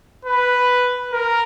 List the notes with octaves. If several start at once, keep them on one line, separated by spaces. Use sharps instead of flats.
B4
A#4